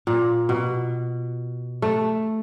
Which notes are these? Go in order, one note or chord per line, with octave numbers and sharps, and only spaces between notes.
A#2
B2
A3